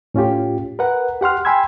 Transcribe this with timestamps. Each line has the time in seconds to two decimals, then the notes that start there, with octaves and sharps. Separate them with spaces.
0.14 A2 C#4 F4 G4
0.79 A#4 B4 F#5
1.21 G4 F#5 C6 F6
1.45 G5 G#5 B5 C6 E6 G#6